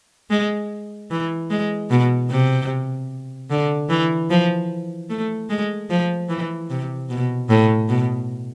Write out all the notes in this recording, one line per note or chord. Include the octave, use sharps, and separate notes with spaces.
G#3
E3
G#3
B2
C3
D3
E3
F3
A3
G#3
F3
E3
C3
B2
A2
B2